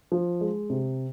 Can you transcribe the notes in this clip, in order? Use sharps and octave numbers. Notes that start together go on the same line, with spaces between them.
F3
G#3
C3